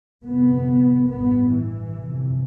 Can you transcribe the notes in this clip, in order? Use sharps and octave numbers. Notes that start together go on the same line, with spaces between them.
G1 F2 C3 B3
A1 G2 B3
E3
G1 F2 C3